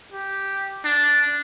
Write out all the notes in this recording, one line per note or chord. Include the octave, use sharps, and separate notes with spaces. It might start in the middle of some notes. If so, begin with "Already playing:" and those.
G4
D4